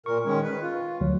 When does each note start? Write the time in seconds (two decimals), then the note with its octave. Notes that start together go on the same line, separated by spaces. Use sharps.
0.06 A#2 A#4 C#6
0.25 D#3 G#3 C#4
0.43 B4
0.62 F4
1.01 D2 F#3